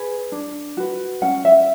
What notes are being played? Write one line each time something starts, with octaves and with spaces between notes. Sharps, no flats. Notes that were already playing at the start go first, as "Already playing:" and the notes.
Already playing: G#4 B4
D4
F#4 B4
C#4 F#5
E5